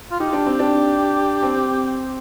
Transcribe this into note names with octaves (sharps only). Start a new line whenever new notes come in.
F4
D#4 G4
D4
C4
D4
C4